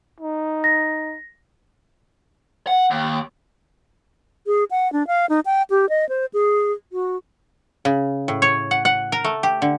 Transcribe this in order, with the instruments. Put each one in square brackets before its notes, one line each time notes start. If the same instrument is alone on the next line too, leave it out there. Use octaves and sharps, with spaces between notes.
[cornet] D#4
[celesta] A#6
[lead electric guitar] F#5
D#2
[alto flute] G#4
F#5
D4
F5
D#4
G5
G4
D#5
C5
G#4
F#4
[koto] C#3
A2
C#5
F#5
F#5
A#4
A3
G4
D3